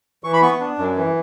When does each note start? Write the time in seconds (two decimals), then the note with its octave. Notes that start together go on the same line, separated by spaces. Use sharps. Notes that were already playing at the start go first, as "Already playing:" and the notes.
0.24 E3 C#6
0.33 B5
0.42 B3 C#6
0.60 D4
0.79 F#2
0.96 E3